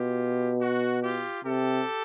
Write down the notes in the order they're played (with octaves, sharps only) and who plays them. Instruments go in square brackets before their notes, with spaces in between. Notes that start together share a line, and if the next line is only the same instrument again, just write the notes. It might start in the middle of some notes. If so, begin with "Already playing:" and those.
Already playing: [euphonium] B2 [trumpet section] F4 G4
[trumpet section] F#4
F4 G4
[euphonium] C3 [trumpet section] G4 A4